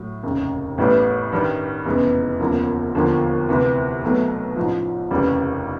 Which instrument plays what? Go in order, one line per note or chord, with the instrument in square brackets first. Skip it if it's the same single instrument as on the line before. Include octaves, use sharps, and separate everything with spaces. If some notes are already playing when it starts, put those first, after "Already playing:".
Already playing: [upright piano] A2 F#3
F1 D#2 C#3
A1 A2 E3 G3 B3
G2 D#3 G3
F1 E2 C#3 E3 G#3
E1 D2 C#3 F3 A#3
E1 D#2 D3 F3 A#3
D2 C3 E3
B1 B2 F#3 A3
A1 G#2 F3
F1 D#2 C#3 E3 G3